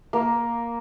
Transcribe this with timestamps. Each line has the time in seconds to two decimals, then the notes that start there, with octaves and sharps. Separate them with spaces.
0.13 A#3